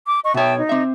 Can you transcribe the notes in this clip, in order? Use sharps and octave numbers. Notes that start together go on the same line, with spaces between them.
D6
D#5 C#6
B2 C#5 E5 G5 A5
D#4
C4 E5